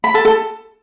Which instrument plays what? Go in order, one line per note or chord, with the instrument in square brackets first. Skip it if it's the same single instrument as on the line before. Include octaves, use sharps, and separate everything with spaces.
[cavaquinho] B5
A4 A5
A4 A5